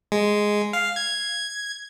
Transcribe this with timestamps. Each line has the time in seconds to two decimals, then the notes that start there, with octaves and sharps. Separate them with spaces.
0.12 G#3
0.73 F5
0.96 G#6